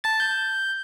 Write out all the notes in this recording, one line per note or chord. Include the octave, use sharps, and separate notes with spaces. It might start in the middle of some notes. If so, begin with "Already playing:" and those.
A5 A6
G6